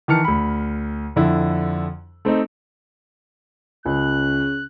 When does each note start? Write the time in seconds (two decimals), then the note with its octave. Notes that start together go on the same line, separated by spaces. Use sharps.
0.08 D#3 E3 A5 F6 C#7
0.24 D2 B5
1.16 F2 D3 E4
2.25 A3 C4 D#4
3.86 C#2 C#3 F#6